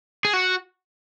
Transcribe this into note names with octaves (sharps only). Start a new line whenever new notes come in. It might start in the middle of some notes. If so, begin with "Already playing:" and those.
G#4
F#4